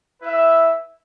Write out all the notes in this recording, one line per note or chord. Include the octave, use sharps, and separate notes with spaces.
E4 B4 E5